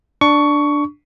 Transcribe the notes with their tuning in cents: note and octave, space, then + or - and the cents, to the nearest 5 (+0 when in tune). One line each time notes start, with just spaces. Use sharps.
D4 +0 C#6 +15